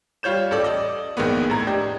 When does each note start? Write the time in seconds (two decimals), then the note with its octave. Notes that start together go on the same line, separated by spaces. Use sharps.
0.23 G3 F4 C#5 G6 E7
0.51 A1 A4 D5
0.64 D5 D#5
1.17 A#1 D#3 G#3 A#3 B3
1.50 A2 A#5 G#6
1.67 D4 G4 D#5